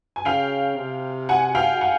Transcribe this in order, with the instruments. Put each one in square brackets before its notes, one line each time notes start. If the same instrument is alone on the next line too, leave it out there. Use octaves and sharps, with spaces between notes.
[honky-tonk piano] G#5
[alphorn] C#3 [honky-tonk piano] F5 G5
[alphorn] C3
[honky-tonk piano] F#5 G#5
F5 G5
F#5 G#5